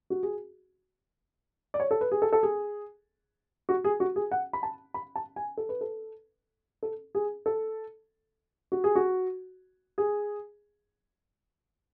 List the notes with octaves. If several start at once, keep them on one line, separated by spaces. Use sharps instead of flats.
F#4
G#4
D5
C#5
A4
B4
G#4
A4
A4
G#4
F#4
G#4
F#4
G#4
F#5
B5
A5
B5
A5
G#5
A4
B4
A4
A4
G#4
A4
F#4
G#4
F#4
G#4